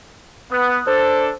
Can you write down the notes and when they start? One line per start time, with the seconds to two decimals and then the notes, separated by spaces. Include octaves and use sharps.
0.52 B3 D#6 F#6
0.87 D4 A4 C5